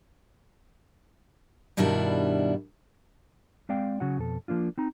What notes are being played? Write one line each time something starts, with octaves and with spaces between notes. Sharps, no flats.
G2 B2 D#3 G3 D4 E4
G#3 C4 D5 F5 G5
C#3 F#3 F#5
F2 B2 A4
F3 A#3 D4 F4
C4 D#4 A#5